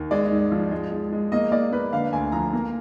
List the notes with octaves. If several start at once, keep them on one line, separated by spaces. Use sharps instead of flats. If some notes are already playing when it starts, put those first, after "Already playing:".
Already playing: D#2
G#3 D5
G#2
F3
G#3
G#3
G#3
A#3 D#5
A#3 D5
A#3 B4
D3 F5
D2 G#5
F3 A#5
A#3